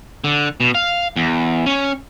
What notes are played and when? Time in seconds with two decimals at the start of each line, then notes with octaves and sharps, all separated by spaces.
0.24 D3
0.60 B2
0.75 F5
1.16 E2
1.66 C#4